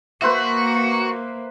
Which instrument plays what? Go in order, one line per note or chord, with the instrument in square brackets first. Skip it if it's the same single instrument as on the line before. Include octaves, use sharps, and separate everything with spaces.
[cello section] A#3 [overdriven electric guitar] F#4 [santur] B4 C5 E5